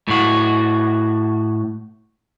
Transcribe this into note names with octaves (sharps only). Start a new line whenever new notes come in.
A2 F#4